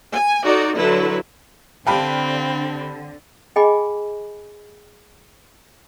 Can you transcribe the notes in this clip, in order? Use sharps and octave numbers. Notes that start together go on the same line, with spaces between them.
G#5
D#4 F#4 A4 D5
D3 F#3 E4 A4 B4
D3 C4 G4 B4 F5 G5 A5
G#4 D#5 G5 G#5 B5 D6